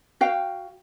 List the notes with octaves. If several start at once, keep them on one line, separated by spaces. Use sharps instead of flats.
F#4 F5 G5